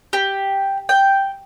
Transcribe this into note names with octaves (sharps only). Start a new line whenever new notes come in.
G4
G5